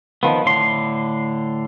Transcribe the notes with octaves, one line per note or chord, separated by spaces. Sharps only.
D#3 F3 B3
A2 D3 C6